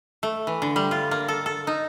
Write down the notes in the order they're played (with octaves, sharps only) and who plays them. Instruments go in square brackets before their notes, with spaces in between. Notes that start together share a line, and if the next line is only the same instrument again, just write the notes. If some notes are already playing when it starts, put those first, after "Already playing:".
[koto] A3
E3
D3
G3
F4
A#3
A4
A4
D#4